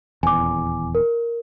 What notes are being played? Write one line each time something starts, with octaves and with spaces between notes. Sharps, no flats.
D#1 E2 G#5 D6
A#4